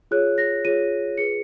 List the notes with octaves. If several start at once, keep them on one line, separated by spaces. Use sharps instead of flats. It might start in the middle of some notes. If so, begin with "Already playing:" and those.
F4 G#4 C#5 F#6
A#6
F4 G#4 C#5 D#7
F4 G#4 B4 C#7